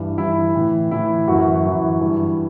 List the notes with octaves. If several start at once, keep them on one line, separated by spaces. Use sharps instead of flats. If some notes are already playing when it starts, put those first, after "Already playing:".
Already playing: G2 E3
G2 E3 E4
A2 E3
A2 E3 E4
F#2 E3 F#4
F#2 E3
G2 E3